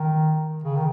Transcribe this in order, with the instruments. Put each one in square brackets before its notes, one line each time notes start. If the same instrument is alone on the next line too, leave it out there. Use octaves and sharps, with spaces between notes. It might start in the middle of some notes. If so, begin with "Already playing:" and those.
Already playing: [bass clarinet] D#3
C#3
D#3